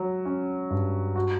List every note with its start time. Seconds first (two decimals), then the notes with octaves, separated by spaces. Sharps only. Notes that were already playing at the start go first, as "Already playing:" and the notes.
Already playing: F#3
0.25 C#4
0.71 G2
1.16 F#4